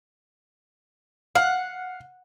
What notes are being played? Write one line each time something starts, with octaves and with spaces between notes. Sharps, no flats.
F5 F#5